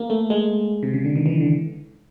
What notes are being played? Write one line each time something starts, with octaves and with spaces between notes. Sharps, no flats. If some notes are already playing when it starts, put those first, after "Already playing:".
Already playing: A#3
A3
G#3
C3
C#3
D3
D#3
E3
D3